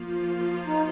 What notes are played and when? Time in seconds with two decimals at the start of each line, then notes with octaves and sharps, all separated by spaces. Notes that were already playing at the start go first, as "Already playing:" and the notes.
Already playing: F3 A#3 F4
0.67 D#4